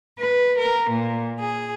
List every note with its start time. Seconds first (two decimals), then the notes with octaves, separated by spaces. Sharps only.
0.18 B4
0.57 A#4
0.90 A#2
1.40 G#4